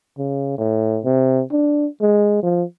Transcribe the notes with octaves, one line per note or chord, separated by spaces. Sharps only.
C#3
A2
C3
D4
G#3
F3